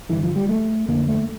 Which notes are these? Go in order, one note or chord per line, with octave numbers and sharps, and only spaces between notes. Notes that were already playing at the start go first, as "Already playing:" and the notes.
G2 D3 E3
F3
G3
A3
F2 D3 A#3
A3